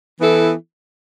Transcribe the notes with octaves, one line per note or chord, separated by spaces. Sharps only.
E3 B3 E4 A4